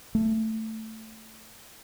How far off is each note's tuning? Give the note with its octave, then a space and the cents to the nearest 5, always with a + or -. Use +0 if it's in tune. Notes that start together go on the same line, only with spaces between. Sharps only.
A3 +10